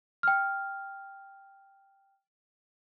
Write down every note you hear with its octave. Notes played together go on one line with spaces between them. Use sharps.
G5 F6